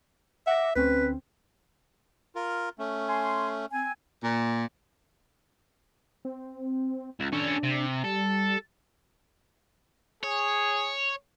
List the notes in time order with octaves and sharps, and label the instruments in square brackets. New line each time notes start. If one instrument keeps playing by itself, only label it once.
[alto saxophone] E5 [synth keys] F#5 D6 A#6
[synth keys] D2 C4 C#4 [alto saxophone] B4
[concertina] F4 A#4
A3 C#4
[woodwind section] G#5 C6
C4 G#5
[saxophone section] A#2
[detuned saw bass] C4
[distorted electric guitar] C#2
[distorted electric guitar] C#4 A4 [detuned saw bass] D4
[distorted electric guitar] C3
[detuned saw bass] G3 [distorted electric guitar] A4
[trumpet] G#4 [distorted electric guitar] C#5